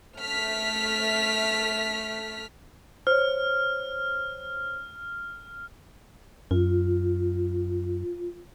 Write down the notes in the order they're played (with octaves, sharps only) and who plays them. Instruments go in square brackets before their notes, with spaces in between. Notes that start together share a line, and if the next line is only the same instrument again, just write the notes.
[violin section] A3 F6 B6
[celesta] C5 C#5 [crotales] F6
[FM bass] F#2 [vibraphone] F4